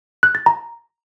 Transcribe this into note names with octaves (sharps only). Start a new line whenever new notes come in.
F#6
A6
A#5